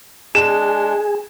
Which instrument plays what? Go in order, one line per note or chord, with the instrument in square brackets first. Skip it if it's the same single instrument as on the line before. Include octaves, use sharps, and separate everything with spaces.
[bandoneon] G#3 D4 [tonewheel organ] G#4 [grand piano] E7